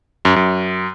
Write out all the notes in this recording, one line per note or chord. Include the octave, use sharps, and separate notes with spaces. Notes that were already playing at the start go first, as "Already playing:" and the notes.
F#2
F#2